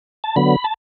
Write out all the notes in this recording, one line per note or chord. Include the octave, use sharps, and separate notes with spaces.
A5
D3 F#3 B3 B5
A5